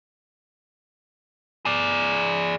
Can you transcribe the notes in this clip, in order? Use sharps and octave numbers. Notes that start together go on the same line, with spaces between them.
G#4 D5